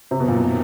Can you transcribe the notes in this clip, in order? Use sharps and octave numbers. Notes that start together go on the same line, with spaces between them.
F#2 C3 D#3 F#3
B2
A#2
B2